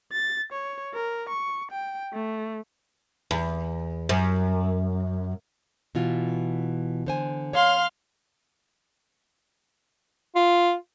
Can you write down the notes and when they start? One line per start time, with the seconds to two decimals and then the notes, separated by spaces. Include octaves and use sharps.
0.12 A6
0.52 C#5
0.94 A#4
1.29 C#6
1.71 G5
2.13 A3
3.31 E2
4.09 F#2
5.95 B2 E3 F4
7.06 D3 C5 G#5
7.53 C#5 F5 C6 F6
10.36 F4